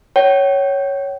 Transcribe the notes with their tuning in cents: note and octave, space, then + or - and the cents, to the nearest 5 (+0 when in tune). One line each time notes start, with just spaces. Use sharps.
C#5 +0 G5 -45